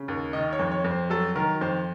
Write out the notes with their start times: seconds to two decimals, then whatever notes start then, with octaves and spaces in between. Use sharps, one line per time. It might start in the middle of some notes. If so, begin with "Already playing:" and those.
Already playing: C#3
0.08 D#2
0.33 D#3 D#5
0.53 C#5
0.59 F2
0.72 C#5
0.84 F2
0.91 C5
1.10 F#3 A4
1.36 D#3 A#4
1.61 F2 C5